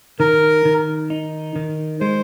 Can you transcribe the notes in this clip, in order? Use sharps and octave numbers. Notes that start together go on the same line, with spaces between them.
D#3 A#4
D#3
D#4
D#3
G#3 C5